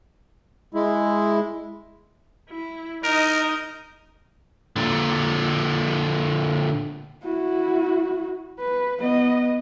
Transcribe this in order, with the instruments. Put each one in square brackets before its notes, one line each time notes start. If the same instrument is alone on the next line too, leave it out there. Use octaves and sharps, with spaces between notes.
[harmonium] G#3 E4
[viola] E4
[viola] D#4 D#5 [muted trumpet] A#4
[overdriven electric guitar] A#2 D3
[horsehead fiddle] E4 F#4
B4
B3 D#5